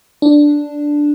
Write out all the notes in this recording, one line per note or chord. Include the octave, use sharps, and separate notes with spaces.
D4